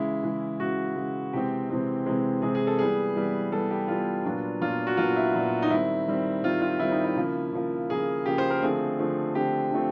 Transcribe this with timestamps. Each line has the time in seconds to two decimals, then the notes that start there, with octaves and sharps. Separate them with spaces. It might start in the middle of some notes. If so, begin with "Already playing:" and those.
Already playing: C#3 E3 G#3 E4
0.23 C#3 E3 G#3
0.60 C#3 E3 G#3 F#4
0.96 C#3 E3 G#3
1.33 C3 E3 G#3 C4 G4
1.70 C3 E3 G#3 C4
2.06 C3 E3 G#3 C4
2.42 C3 E3 G#3 C4 G#4
2.55 G#4
2.67 A4
2.78 E3 G3 B3 G#4
3.15 E3 G3 B3
3.52 E3 G3 B3 A4
3.71 G4
3.88 E3 G3 B3 F4
4.25 A#2 F#3 B3 D4
4.61 A#2 F#3 B3 D4 F4
4.87 F#4
4.97 A#2 F#3 B3 D4 F4
5.16 E4
5.34 A#2 F#3 B3 D4
5.62 D#4
5.70 D#3 G3 C4 E4
6.07 D#3 G3 C4
6.44 D#3 G3 C4 F4
6.62 F4
6.80 D#3 G3 C4 E4
6.91 D#4
7.04 E4
7.16 C#3 F3 A#3
7.53 C#3 F3 A#3
7.89 C#3 F3 A#3 G#4
8.26 C#3 F3 A#3 G4
8.38 C5
8.50 A#4
8.62 D3 F3 A3 C4 G#4
8.99 D3 F3 A3 C4
9.35 D3 F3 A3 C4 G4
9.71 D3 F3 A3 C4